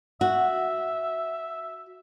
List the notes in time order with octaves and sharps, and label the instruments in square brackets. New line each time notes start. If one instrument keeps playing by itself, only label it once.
[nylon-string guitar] F#4 [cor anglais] E5